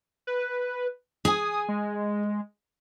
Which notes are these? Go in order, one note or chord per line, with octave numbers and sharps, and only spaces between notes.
B4
G#4 G#5 D#6
G#3